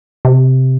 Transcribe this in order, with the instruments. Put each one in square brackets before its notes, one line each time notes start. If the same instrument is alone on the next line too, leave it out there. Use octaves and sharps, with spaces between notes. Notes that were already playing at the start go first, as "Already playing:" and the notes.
[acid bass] C3